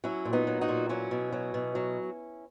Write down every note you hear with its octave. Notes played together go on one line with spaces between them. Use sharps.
F#3 C#4 E4
A#2
B3 D#4
F#3
D#4 F#4
A#2
F#3 C#4 E4
B2
F#3
B2
F#3